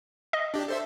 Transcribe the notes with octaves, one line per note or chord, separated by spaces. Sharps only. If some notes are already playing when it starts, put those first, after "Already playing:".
D#5
D4 G4
A4 C5 E5